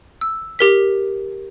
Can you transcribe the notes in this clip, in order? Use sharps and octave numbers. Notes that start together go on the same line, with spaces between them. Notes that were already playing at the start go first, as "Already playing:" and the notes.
E6
G4 A#4 B6